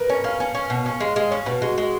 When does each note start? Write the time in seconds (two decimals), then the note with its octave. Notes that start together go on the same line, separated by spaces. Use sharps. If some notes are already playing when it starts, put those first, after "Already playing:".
Already playing: A#4 B4
0.10 C#4 C#5
0.24 C#4 F5
0.40 C#4
0.55 C#4
0.70 B2
0.86 C#4
1.00 G#3 F5
1.16 G#3 F5
1.31 C#4 C#5
1.46 B2 B4
1.62 G#3 F#4
1.78 G#3 F#4